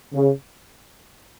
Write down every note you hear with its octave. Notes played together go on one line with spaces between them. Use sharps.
C#3